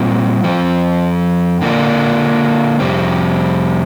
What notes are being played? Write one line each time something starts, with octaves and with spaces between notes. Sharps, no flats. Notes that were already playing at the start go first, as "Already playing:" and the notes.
Already playing: A#2 G3 C4 F4
F2 F3 C4
D3 A#3 D4 F4
F2 C3 G3 C4